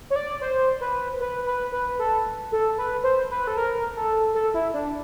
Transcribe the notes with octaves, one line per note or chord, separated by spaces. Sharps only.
C#5
D5
C5
B4
B4
B4
B4
A4
A4
B4
C5
B4
A4
A#4
A4
A4
E4
D4